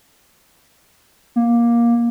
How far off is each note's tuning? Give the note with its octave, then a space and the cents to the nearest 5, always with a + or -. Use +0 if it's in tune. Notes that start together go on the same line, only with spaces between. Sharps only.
A#3 +15